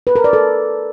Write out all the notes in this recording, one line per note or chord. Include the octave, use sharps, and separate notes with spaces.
B4
A#4
D5
A4